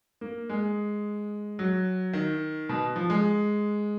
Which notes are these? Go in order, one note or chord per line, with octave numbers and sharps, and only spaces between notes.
A#3
G#3
F#3
D#3
B2
F3
G#3